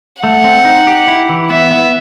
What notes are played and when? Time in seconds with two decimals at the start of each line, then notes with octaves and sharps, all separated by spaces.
0.23 A3 F#5
0.44 C4
0.65 D#4
0.87 G4
1.08 E4
1.29 E3
1.50 B3 E5
1.71 B3